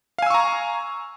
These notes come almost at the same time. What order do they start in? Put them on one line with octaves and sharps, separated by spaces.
F5 G#5 E6 C#6 A#5